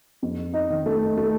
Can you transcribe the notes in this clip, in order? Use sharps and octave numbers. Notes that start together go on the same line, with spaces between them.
F2
D#4
D#3
A3
A3